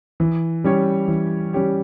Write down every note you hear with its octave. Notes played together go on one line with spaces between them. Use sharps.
E3
G3 C#4 G4 C#5
E3
G3 C#4 G4 C#5